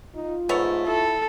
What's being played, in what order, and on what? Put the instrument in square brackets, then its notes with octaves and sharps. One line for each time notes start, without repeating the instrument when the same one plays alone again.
[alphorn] D#4 [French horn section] F4
[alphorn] G#2 [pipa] A3 B3 C#5
[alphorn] E4 [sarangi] A4